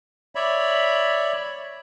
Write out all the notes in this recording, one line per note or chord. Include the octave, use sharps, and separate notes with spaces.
C#5 D5 E5 B5